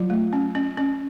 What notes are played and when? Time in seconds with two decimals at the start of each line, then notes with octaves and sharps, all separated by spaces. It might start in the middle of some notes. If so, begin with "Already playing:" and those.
Already playing: F#3 F4
0.10 A3
0.33 C#4
0.55 C#4
0.77 C#4